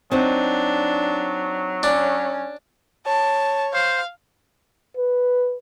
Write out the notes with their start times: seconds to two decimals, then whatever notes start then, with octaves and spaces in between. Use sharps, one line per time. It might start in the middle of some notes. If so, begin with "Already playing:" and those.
0.12 F#3 C4 D4 D#4 F#5
1.83 C#4 D4
3.07 C#5 A5
3.74 C5 F5
4.97 B4